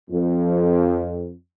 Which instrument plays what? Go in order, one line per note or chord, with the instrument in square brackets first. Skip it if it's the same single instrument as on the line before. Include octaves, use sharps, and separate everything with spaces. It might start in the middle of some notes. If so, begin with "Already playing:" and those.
[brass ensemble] F2